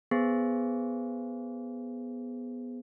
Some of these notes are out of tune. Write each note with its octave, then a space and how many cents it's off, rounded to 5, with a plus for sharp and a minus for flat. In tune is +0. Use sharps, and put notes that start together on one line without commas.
B3 +0 G#4 +0 C5 +0